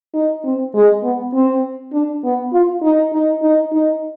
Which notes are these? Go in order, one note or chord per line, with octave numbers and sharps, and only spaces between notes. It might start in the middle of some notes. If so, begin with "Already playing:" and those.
D#4
C4
G#3
B3
C4
D4
B3
F4
D#4
D#4
D#4
D#4